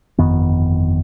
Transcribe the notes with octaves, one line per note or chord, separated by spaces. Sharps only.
G1 F2 D#3 B3